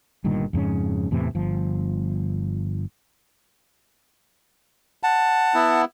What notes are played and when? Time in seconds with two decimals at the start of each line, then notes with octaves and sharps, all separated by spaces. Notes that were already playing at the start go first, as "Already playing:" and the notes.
0.24 G1 G2 A#2 D#3
0.53 F2 G#2 C#3 C#4
1.11 E2 A2 C3 E3
1.35 G1 F3
5.03 F#5 A5
5.54 B3 E4